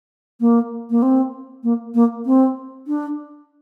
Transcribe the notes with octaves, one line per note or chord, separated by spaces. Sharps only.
A#3
A#3
C4
A#3
A#3
C4
D4